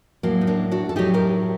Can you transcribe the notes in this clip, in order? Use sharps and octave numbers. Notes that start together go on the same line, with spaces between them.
A2 F#3 A#3
D#4
A#3 D4
D4 F#4
A4
A2 F#3 D#4 G4
G4 A#4